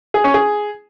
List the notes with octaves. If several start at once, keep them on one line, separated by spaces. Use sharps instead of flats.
G#4
C#4
G#4